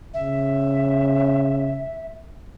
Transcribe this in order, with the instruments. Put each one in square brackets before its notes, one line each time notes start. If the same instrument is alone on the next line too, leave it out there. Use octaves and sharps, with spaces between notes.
[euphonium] C#3 [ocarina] E5